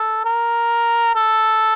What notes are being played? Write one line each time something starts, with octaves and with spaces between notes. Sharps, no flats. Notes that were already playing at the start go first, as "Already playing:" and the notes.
Already playing: A4
A#4
A4